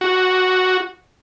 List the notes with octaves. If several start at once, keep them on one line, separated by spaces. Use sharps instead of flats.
F#4